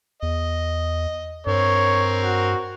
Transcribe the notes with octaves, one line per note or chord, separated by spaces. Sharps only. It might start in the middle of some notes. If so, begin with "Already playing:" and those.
E2 D#5
G2 C4 A#4 C#5
F#4